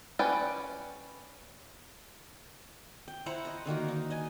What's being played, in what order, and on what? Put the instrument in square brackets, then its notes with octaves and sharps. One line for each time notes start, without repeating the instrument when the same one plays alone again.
[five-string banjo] C#4 B4 D5 G5
[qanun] G5
E4 C5 F#5 A#5
D#5 A#5
D3 D#3 A#3 F#4
D#4
D#5 G#5